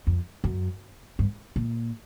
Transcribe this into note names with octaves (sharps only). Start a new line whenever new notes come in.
F2
F#2
G2
A#2